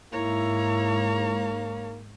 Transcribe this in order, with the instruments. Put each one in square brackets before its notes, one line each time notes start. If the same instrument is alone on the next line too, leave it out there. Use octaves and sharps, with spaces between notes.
[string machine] G#2 [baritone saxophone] A#3 [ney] E4 [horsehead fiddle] C#5 A#5